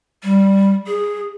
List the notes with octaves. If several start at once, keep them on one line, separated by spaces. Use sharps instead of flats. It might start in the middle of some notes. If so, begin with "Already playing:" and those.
G3
G#4